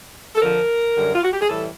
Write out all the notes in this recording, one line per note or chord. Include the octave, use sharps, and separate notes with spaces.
A4
F2 D3 F3 A#4
F#2 D3 G3
F4
F#4
G4
G#4
A2 E3 G3 A4